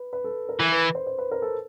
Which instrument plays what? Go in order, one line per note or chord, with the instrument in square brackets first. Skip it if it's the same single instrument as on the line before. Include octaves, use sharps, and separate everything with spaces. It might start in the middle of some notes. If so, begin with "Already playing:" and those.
Already playing: [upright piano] B4
B4
A4
A#4
[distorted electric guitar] E3 [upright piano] B4
[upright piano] B4
C5
C5
B4
A#4
A4